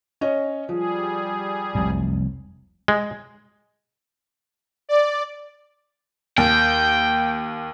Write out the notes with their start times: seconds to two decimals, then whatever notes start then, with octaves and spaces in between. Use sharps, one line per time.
0.21 C#4 C#5 D#5
0.69 F3 G3 G#4
1.75 F1 C2 F#2
2.88 G#3
4.89 D5
6.38 D#2 G5